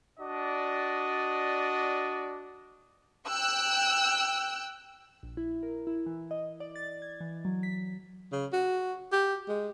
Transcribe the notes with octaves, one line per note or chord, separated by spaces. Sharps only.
D4 F#4 D5 D#5
G5 E6 F#6
A#1
E4
A#4
E4
E3
D#5
D5
A6
G#6
E3
F#3
B6
C#3
F#4
G4
G#3